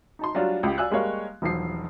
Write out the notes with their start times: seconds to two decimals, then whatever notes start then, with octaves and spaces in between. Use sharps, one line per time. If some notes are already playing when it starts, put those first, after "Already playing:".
0.19 D#4 A5 C6
0.35 F#3 G3 D4 F4 F#4
0.63 C#2 G4
0.78 D5 F5 G#5 E6 F#6
0.90 G3 G#3 A#3 C#5 F5
1.42 E1 B1 F3 C7